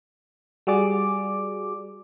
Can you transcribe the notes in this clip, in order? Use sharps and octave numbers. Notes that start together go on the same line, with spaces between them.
G3 F#4 G#4 D5 D6